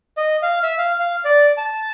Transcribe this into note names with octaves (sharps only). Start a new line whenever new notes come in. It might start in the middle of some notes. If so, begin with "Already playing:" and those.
D#5
F5
E5
F5
F5
D5
A5